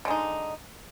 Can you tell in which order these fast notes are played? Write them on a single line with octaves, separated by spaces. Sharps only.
D3 G#3 D#4